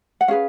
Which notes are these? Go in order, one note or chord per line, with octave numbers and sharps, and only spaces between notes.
F#5
C#4 G#4 B4 F5